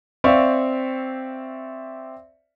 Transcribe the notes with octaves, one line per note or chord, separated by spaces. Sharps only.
C4 D5 E5 F5 C#6